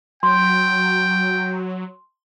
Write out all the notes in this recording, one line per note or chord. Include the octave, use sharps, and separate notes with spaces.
F#3 G5 C6